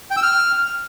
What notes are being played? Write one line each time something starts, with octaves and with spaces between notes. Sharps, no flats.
G5
E6
F6